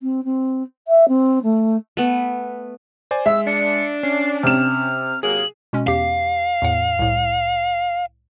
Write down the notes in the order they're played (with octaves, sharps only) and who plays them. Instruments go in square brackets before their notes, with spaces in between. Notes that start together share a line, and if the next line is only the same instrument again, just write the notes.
[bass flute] C4
C4
E5
C4
A3
[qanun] A3 B3
[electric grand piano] C5 D5 G#5
[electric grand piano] G#3 [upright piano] E5 [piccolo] E6
[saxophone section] D4 [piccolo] C#7
[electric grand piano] C#4 [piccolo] C7
[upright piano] C3 E7 [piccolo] F6
[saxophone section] C3 F#3 A#3 [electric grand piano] G#4 [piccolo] F#7
[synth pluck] B2 G#3 C#4
[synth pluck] E2 G4 C7 [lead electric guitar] F5
[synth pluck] E2 A2 F#5
C2 A2